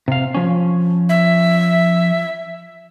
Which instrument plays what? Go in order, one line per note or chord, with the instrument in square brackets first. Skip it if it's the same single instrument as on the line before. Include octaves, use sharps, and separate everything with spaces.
[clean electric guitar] C3 F5
F3 C#4
[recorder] E5